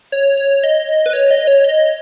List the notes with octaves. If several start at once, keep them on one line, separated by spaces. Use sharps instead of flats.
C#5
C#5
D#5
D#5
B4
C#5
D#5
C#5
D#5